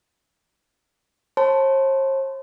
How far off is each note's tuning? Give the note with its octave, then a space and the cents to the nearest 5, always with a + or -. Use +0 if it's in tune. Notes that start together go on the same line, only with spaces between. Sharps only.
C5 +45 A5 +0 C6 -40